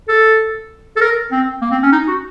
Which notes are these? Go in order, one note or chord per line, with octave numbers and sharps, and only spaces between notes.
A4
A4
A#4
C4
A#3
C4
C#4
D#4
F#4